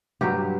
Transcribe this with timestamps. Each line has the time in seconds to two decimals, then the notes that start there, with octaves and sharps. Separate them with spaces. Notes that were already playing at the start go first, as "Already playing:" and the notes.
0.21 G2 F#3 G4